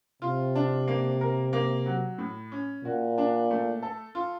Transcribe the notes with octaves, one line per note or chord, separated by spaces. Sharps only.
C3 F4
D4
A#3
A#4
A#3
F#3
A2
C#4
A#2 F#4
D4
A3
A4
F4